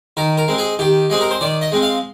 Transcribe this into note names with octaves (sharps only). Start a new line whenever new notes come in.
D#3 A#4
A#4
G#3 C4
G#4
D#3 G4
G#3 C4 G#4
A#4
C5
D#3 D5
D#5
G#3 C4
F5